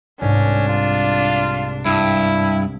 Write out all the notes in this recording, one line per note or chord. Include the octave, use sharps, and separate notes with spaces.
C2 G#2 C#4 D4
F4
G2 E4